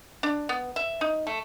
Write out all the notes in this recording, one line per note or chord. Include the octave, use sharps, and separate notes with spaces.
D4
B3
E5
D#4
A3